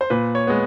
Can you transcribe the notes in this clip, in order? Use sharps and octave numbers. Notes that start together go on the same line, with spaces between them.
C5
A#2 B4
C#5
G#3 B3